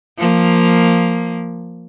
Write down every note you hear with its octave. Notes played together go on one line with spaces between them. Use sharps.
F3 A#3